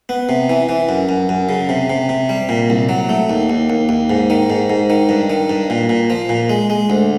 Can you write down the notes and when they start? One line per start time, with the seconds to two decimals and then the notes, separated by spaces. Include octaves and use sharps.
0.09 B3
0.29 C3
0.50 E3
0.69 E3
0.89 F#2
1.09 F#2
1.29 F#2
1.49 C#3
1.69 C3
1.90 C3
2.09 C3
2.29 G3
2.49 A#2
2.70 C2
2.89 F#3
3.09 A3
3.30 D#2
3.50 D#2
3.70 D#2
3.89 D#2
4.10 G#2
4.30 D#3
4.50 G#2
4.70 G#2
4.90 D#3
5.09 G2
5.30 D#3
5.50 G2
5.70 A#2
5.89 A#2
6.10 F3
6.29 A#2
6.50 G#3
6.70 G#3
6.90 D2